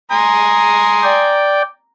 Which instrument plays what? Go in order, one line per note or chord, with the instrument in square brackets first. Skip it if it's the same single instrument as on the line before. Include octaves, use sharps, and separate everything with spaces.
[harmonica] G#5 C6 D#6 [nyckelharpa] A#5
[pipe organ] D5 G5